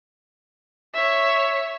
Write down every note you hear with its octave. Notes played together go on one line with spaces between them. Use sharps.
C#5 E5